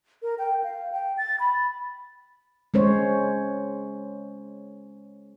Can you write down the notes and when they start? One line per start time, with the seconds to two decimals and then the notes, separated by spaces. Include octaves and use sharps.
0.22 A#4
0.38 G5
0.64 F5
0.92 G5
1.18 A6
1.40 B5
2.74 G#3 C#4 C5 C#5